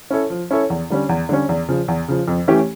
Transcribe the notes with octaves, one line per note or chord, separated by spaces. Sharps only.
C#4 E4 A4 C#5
F3
C#4 E4 A4 C#5
E2
D3 G3 C#4
E2
D3 G3 C#4
E2
C#3 F3
E2
C#3 F3
F2
E3 A3 C#4 G4